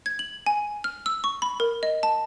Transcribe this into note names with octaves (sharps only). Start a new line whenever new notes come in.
G#6
F#7
G#5
F6
E6
C#6
B5
A#4
D#5
A5